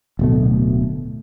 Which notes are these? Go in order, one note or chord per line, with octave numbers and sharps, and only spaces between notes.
D1 B2 A3